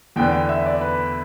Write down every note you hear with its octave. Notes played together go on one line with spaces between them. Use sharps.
E2 D3 B3 D4 G5
G5
E5
D5
B4